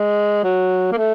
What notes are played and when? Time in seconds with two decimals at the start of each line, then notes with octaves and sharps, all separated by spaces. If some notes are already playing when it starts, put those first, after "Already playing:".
Already playing: G#3
0.44 F#3
0.92 A#3
0.98 A3